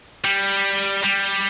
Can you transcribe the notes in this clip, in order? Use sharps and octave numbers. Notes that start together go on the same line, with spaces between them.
G3
G3